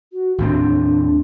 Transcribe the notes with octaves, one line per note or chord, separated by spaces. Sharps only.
F#4
D#2 A2 C4 D4